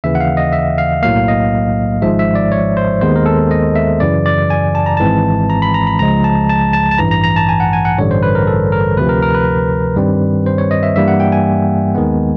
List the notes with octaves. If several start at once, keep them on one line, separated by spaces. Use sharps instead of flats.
D#2 C#3 E3 E5
F#5
F5
D#5
E5
F5
B1 A2 F#3 A#3 F5
D#5
G#1 G#2 F3 G#3 E5
E5
D5
C#5
C5
D#2 D#3 G#3 B3 C5
A#4
A4
D#5
E5
F#2 C#3 E3 D5
D5
G#5
A5
A#5
G#1 G#2 E3 G#3 C4 A5
A#5
B5
A#5
B5
C#2 C#3 F3 G#3 A#5
A5
A5
A5
A5
A1 G2 E3 A#5
A#5
A#5
A5
G#5
F#5
G#5
F#5
A1 G2 D3 G3 C#5
C5
B4
A#4
A4
A#4
D2 C3 F3 B4
A#4
A#4
B4
G2 D#3 G3 C4
C5
C#5
D#5
E5
G2 E3 G3 A#3 E5
F#5
G5
G#5
D#2 D#3 G#3 B3